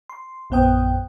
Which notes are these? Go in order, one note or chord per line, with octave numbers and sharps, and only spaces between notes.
C6
A#1 F#2 B3 C5 G5 D#6